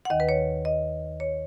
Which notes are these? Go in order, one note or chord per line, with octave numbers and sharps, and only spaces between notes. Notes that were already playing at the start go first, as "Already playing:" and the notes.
F#5
D#2 D#3 D#5
B4
C#5
D#5
C#5